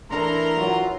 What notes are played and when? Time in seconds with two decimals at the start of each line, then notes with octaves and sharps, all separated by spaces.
0.10 E3 A3 D4 E4 A4 A#4 A#5 C6
0.58 F#3 F4 F#4 F5